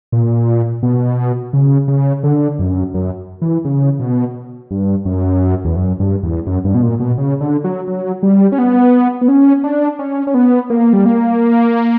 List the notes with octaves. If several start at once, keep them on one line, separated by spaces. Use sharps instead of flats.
A#2
B2
C#3
C#3
D3
F#2
F#2
E3
C#3
B2
G2
F#2
E2
F#2
G2
E2
F#2
G2
B2
A#2
B2
C#3
D3
F#3
F#3
G3
C#4
B3
B3
C#4
D4
C#4
C#4
B3
A#3
G3
A#3